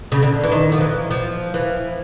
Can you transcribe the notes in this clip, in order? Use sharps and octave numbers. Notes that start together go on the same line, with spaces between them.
C#3
D3
E3
D#3
F3
E3
F3
E3